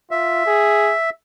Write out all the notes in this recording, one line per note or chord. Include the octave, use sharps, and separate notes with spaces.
F4 E5
G#4